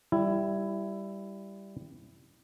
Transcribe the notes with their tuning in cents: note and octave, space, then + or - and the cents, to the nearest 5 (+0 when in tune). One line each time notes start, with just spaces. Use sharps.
G3 +0 E4 +15